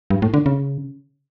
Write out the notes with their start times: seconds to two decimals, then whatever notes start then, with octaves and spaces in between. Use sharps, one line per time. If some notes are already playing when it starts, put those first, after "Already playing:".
0.10 G2
0.22 A2
0.34 D3
0.46 C#3